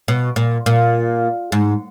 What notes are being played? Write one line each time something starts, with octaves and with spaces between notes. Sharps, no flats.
B2
A#2
A#2
G#2